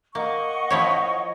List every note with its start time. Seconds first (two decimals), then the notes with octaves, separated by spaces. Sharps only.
0.15 A#3 D#5 F#5 C#6
0.70 F3 E4 C#5